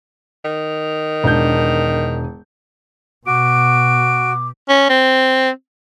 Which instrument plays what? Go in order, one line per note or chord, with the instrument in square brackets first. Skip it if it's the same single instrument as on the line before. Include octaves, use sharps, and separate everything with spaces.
[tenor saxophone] D#3
[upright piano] E1 D4 G6
[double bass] B2 [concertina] F#4 [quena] D6 [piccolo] D7
[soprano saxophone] C#4
C4